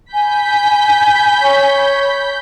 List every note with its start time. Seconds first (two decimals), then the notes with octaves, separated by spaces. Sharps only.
0.14 G#5 B5 G6 B6
1.42 C#5